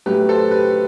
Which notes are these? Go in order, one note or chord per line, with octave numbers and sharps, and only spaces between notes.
A2 F#3 A3 G4 B4
A4 C5
G4 B4